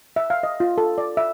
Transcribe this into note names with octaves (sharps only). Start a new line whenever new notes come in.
E5
F5
D#5
F4
A4
D5
E5